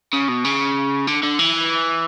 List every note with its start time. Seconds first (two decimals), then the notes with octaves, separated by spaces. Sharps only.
0.13 C#3
0.29 B2
0.45 C#3
1.07 D3
1.23 D3
1.39 E3